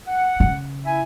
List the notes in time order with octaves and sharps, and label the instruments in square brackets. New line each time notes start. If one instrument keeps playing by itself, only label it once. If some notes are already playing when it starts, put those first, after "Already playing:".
[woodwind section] F#5
[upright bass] C#3
[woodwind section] E4 E5 G#5